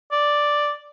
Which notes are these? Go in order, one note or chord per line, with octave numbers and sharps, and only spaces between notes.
D5